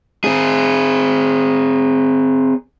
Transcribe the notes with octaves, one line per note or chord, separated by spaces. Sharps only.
C4 G#4